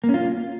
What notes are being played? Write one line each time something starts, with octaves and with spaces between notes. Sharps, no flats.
A#3
C#4
F4